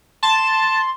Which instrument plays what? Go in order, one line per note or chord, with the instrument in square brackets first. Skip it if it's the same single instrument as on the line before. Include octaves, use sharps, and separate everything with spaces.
[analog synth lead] A5 [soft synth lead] C6